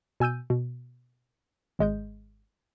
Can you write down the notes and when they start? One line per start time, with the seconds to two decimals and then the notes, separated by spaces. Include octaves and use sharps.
0.20 B2 G#5 E6 G6 D#7
0.50 B2
1.79 G#1 G#3 D#5 G6